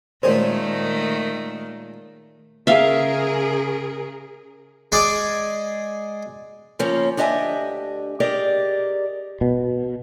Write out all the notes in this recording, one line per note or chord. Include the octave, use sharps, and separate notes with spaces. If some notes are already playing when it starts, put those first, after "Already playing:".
A#2 D#3 G#3 A3 C#4 C5
C#3 G#4 A#4 E5 F5
G#3 G#4 D5
C#3 F3 A#3 C4 C#4
D2 D4 G4 D#5 E5 G#5
G4 G#4 A#4 D5 D#5
B2